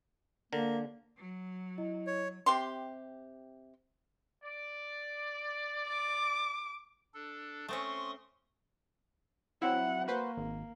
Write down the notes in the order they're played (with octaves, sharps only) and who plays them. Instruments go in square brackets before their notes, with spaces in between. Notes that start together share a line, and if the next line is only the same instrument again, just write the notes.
[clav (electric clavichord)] D3 [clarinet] A#3 [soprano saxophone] A#4
[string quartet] F#3
[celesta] E4 D#5
[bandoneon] C#5
[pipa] C3 G4 C6
[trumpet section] D5
[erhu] D6
[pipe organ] D4 A4
[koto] A3 C4 C#4 [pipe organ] C6 C#6 D#6
[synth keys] F#3 C4 E4 [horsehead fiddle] F#5
[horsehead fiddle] A#3 [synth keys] F#4 B4 C5
[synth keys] G#1